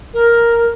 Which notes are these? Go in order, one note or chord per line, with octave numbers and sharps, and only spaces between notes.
A#4